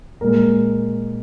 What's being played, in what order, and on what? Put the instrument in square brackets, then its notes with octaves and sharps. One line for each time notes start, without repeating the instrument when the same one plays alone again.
[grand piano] A#2 G#3 A#4